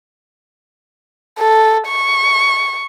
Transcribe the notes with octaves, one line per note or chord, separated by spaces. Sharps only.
A4
C#6